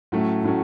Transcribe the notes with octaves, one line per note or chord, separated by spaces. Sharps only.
A2 F#3 A3 C#4
A2 F#3 A3 C#4